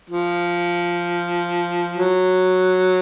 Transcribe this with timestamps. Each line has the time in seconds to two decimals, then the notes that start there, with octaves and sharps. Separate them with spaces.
0.10 F3
1.97 F#3